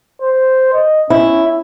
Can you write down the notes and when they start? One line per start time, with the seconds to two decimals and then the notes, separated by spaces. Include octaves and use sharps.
0.22 C5
0.73 D#5
1.10 C#4 E4